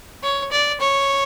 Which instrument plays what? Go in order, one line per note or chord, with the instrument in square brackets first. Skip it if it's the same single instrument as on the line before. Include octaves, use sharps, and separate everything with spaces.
[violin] C#5
D5
C#5